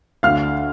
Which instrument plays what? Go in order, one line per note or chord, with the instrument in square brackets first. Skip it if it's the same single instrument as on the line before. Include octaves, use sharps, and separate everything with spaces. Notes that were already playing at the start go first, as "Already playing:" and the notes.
[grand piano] D2 D3 F5 F6